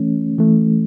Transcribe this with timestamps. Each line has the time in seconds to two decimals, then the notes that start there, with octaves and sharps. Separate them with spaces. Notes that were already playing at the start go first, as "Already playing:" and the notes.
Already playing: E3 A3 C#4
0.38 E3 A3